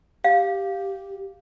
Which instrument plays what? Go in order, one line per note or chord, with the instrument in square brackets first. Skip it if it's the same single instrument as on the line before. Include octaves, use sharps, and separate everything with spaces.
[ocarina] G4 [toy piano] F5